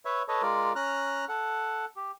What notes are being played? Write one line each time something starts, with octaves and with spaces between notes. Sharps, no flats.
B4 C#5 E5
A4 B4 C#5 D#5
G#3 F4 A#4 D5
C#4 A#5 F6 F#6
A4 F#5
G4